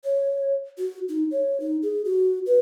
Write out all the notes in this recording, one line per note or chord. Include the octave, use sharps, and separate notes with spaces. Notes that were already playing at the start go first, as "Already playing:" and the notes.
C#5
F#4
D#4
C#5
D#4
G#4
F#4
B4